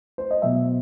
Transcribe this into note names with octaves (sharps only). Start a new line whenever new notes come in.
C5
D#5
B2 F#3 B3 E5